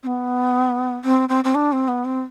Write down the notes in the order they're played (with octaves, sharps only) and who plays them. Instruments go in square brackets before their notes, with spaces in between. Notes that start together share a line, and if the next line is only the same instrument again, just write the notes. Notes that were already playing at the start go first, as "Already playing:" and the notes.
[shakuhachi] C4
B3
C4
C4
C4
D4
C4
B3
C4